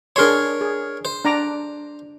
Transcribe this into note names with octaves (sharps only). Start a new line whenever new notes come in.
D4 G#4 A#4 C#5 C6
G#4
C5
D4 A#5 D6